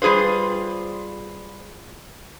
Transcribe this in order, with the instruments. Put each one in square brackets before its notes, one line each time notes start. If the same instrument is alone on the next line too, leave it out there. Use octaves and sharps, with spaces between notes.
[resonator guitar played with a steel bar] G3 F4 G#4 B4 C5